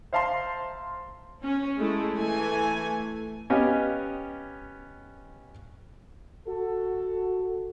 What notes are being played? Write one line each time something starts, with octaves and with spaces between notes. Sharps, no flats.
C5 E5 F5 A5 A#5 C6
C#4
G#3 A3 E4
E3 A3 G#5
B3 C#4 G4 D#5 F5 G#5
F#4 A4